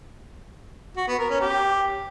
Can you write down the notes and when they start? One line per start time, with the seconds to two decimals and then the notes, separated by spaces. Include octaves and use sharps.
0.96 F#4
1.07 B3
1.18 A#4
1.29 C#4
1.40 G4